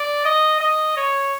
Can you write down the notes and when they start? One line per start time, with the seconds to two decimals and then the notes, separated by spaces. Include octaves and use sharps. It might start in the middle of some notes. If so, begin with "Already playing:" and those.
Already playing: D5
0.25 D#5
0.60 D#5
0.97 C#5